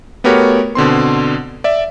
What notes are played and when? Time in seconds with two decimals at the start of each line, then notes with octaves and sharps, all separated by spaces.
0.24 A3 B3 F#4 G4 A#4 C#5
0.75 B2 D3 C4 C6
1.64 D5 E5